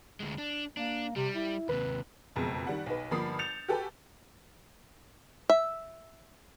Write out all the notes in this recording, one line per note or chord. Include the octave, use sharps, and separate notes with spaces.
D2 G#3
D4
A#3 D4
C3 G3
E4
D#2 C3 B4
F#1 F2 B2 G#3
D#3 G3 F#5
B1 D#4 B4
G1 F3 A#3 B5 D#6 C7
G6 A6 C#7 E7 F7
F#4 G4 A4 B4 G#5
E5